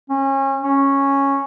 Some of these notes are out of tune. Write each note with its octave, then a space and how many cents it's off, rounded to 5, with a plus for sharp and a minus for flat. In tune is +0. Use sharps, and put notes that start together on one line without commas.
C#4 -30
C#4 -5